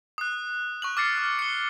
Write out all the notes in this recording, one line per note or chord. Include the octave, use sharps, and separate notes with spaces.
D#6 F#6
C#6 F#6 F#7
D6 F6 A6 C7 C#7
F6
C#7 G7